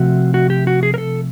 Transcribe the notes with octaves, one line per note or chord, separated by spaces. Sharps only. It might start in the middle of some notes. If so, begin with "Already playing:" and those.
Already playing: C3 F3 A3 C4 F#4
F#4
G4
F#4
G#4
A#4
A4